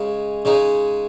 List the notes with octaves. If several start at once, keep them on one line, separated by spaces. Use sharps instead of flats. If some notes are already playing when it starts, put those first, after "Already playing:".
Already playing: C#3 G#3 D#4
C#3 G#3 D#4